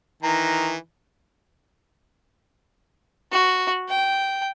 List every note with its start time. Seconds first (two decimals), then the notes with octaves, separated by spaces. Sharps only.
0.23 D#3 E3 A#5
3.32 F#4
3.89 G5